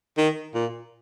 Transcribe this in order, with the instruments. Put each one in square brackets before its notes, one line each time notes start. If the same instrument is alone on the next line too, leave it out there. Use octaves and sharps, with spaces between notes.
[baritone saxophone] D#3
A#2